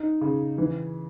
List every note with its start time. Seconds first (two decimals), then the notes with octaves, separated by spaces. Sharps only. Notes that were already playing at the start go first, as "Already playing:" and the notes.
Already playing: D#4
0.21 C#3
0.58 E3